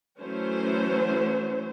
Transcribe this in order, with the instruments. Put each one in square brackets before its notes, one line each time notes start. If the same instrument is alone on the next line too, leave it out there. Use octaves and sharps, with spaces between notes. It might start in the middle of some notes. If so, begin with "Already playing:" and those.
[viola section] E3 F#3 A3 C#4 C5